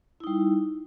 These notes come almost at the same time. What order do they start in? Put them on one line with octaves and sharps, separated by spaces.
E4 D#4 G3